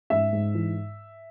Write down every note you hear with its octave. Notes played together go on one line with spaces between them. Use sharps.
G#2 E5
G#2
E3